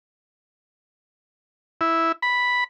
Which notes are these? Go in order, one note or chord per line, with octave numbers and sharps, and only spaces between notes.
E4
B5